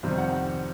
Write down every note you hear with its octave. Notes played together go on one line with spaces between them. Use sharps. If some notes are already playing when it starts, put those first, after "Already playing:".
F2 C3 D#3 G3
F#5